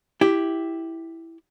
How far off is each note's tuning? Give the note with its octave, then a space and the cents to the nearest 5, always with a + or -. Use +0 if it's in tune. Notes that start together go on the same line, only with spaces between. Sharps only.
E4 +0 G4 +0